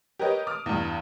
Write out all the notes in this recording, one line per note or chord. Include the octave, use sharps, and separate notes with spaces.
G4 A#4 B4 C#5 D#5
D6 D#6 F6
E2 G2